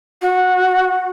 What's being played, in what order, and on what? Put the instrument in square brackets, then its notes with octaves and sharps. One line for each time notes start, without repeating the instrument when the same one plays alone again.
[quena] F#4